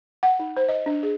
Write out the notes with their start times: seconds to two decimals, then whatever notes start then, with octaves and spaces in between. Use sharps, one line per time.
0.23 F#5
0.40 D#4
0.57 C5
0.69 D#5
0.86 D4
1.03 G#4